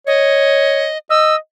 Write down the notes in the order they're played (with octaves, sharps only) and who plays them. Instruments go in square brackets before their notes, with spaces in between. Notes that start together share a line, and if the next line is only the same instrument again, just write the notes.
[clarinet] C#5 [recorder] D#5
[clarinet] D#5 [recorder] E6